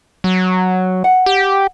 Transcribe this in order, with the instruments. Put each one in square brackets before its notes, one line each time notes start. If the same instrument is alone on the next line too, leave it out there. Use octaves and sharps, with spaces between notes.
[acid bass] F#3
[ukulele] F#5
[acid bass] G4